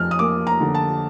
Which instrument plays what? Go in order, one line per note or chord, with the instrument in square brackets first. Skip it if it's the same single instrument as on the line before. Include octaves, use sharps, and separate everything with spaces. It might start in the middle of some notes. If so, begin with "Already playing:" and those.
Already playing: [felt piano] F2 F6
D#6
A#3 D6
A#5
D3
A5